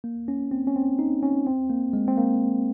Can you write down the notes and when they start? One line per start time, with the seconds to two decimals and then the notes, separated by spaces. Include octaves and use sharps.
0.04 A#3
0.28 C#4
0.51 C4
0.67 C#4
0.76 C4
0.99 D#4
1.23 C#4
1.47 C4
1.70 A#3
1.93 G#3
2.08 C4
2.17 A#3